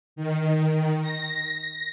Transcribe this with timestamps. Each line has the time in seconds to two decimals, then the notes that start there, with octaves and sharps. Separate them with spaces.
0.16 D#3
1.02 A#6